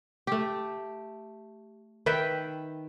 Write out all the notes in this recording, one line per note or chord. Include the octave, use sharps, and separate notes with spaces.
A3 G4
D#3 B4 E5 G5